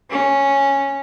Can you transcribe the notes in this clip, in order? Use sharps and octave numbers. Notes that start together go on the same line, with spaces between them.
C#4